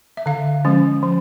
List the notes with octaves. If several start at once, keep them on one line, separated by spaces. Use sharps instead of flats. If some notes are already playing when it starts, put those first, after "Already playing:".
E5
D3 F5
F3 G#3 C#4
F3